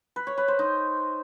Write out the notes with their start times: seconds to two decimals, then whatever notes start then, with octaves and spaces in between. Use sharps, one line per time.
0.16 B4
0.27 C#5
0.37 B4
0.48 C5
0.59 D#4